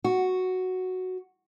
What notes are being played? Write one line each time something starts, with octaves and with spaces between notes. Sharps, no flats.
F#4